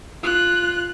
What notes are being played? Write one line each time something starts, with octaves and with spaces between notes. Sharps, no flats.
F4 F#6